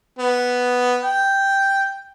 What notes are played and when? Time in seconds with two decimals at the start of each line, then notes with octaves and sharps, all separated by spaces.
0.19 B3
1.02 G5